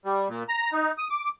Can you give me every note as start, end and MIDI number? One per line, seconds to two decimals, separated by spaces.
0.05 0.28 55
0.29 0.43 46
0.49 0.71 82
0.72 0.92 63
0.98 1.08 87
1.10 1.29 86